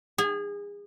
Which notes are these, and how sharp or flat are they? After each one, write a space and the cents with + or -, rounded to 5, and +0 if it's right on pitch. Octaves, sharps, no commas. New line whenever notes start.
G#4 -30 G#5 +25